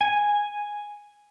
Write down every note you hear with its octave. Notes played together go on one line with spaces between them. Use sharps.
G#5